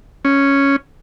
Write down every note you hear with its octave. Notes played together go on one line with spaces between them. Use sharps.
C#4